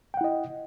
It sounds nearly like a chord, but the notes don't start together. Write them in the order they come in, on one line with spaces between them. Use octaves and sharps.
G5 F#5 E4 D#5